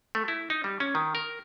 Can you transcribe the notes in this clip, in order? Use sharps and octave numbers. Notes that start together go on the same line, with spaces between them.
A3
E4
D#4
G3
C#4
D#3
A#4